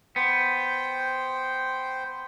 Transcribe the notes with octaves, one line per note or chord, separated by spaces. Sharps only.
B3 C5 G5